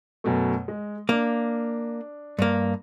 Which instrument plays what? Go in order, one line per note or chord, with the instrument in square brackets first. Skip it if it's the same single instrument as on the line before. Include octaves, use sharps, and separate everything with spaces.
[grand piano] F#2 B2 A3
G#3
[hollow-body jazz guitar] A#3 [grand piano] D4
[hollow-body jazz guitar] G2 A#3